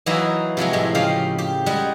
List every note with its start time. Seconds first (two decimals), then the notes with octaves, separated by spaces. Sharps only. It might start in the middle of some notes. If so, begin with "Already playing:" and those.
0.06 E3 F#3 A#3 D#4 E4 F#4
0.57 C3 F3 F#3 G#3
0.73 A2 G#3
0.95 C#3 F3 G4 F5
1.38 G4
1.66 G3 G#3 G#4 F#5